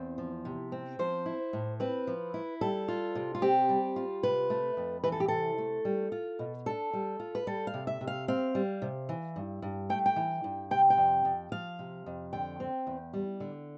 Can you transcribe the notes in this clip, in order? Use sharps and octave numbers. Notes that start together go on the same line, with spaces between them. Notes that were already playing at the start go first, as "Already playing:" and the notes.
Already playing: E2 C4
F3
C3
C4
F3 C5
E4
A2
C4 B4
F3
E4
G3 A4
F4
C3
F4
C4 G4
G3
F4
C3 B4
A3
F2
E3 B4
A4
G4
C3 A4
A3
G3
F4
B2
D4 A4
G3
F4
B4
G3 A4
F5
C3
E5
C3
F5
C4 F5
G3
C3
E3
G2
G2
A3 G5
G5
E3
G2
C3 G5
G5
F2
F2
F3 F5
C3
F2
D3 G5
C4
E2
G3
D3